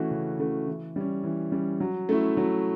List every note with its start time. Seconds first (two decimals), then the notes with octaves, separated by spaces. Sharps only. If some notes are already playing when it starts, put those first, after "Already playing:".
Already playing: E3 A3 C#4 F#4
0.11 C#3
0.39 E3 A3 C#4 F#4
0.67 E3
0.96 G3 C#4
1.24 E3
1.52 G3 C#4
1.80 F#3
2.09 A3 C#4 E4
2.37 F#3